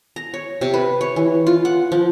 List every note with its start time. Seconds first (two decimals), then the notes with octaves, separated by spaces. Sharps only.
0.16 A#5
0.34 C#5
0.61 C3
0.74 B4
1.01 C#5
1.16 E3
1.47 F4
1.65 F#5
1.92 F3